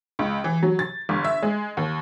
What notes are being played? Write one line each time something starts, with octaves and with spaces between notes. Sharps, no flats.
C#2
E3
F#3
A6
G1
E5
G#3
D#2